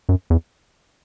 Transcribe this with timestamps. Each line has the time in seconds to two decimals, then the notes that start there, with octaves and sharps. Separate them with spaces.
0.09 F#2
0.30 E2